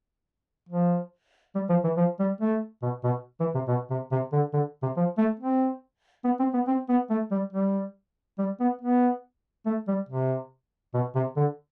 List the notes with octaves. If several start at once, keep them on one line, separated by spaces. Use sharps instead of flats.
F3
G3
F3
E3
F3
G3
A3
B2
B2
E3
C3
B2
C3
C3
D3
D3
C3
F3
A3
C4
B3
C4
B3
C4
B3
A3
G3
G3
G3
B3
B3
A3
G3
C3
B2
C3
D3